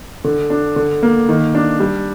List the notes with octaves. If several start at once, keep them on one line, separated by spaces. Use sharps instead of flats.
D3
D4
D3
A#3
D#3
D4
G3